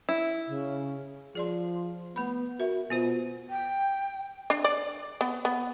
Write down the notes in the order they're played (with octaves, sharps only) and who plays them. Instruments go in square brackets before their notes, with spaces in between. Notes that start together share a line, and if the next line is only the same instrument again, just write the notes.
[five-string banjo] E4
[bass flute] C#3
[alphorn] F3 [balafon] G#4 D5 C6
[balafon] A3 B5 [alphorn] B3
[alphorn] F#4 [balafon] A#4 E5
[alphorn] B2 [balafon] B3 F4 C5
[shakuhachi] G5
[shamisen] D4
D5
B3
B3